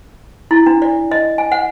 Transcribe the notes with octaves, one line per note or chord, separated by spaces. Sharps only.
E4
D4
D5
D#5
G#5
F#5